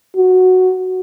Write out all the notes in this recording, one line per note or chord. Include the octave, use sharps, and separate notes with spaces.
F#4